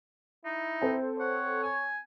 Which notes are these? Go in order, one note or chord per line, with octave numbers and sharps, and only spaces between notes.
D#4 E4
C4 A4 C5
C#5 F#5
G#5